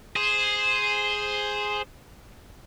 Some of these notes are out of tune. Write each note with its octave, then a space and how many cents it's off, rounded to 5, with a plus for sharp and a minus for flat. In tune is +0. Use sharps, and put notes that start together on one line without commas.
G#4 +0 C5 +0